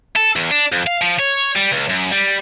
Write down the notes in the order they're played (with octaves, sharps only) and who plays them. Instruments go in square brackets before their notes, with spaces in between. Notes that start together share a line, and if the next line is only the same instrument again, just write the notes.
[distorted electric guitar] A4
E2
D4
F2
F5
F3
C#5
G3
C#2
F#2
G3